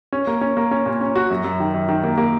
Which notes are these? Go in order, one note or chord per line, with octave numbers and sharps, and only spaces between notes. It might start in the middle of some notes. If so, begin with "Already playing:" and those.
C#4
A#3
C#4
A#3
C#4
A#2
C#4
F#4
F#2
F#2
D#3
F#2
D#3
A#3
A#3